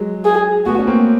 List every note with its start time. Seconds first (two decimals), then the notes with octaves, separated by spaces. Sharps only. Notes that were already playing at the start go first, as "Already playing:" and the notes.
Already playing: F#3 G#3
0.25 G#4
0.66 A3 B3 F#4
0.79 C#4
0.87 A#3 C4